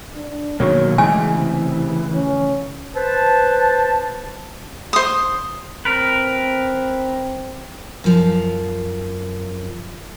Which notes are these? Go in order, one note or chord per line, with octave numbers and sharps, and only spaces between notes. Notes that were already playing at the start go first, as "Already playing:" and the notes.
D4
B2 D#3 F#3 A#3 C#5
C#3 E3 G#3 A3 G#5
C3
C#4
B4 C5 A5
C5 D#6
C4 A#4 B4
F#2 F3